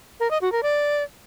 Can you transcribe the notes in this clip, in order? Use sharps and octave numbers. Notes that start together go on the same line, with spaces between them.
A#4
D#5
F#4
A#4
D5